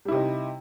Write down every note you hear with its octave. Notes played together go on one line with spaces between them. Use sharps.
C3 G3 D#4 E4